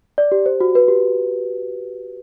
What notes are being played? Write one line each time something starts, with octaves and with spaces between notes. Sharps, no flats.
D5
G4
C5
F#4
B4
G4